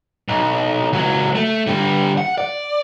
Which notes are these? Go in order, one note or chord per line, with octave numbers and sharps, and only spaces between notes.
B1
C#2 F#3
A3
D3 G3
F#5
D5